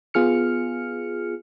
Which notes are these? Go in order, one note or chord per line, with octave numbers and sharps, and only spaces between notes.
B3 F4 G#4 F6 C#7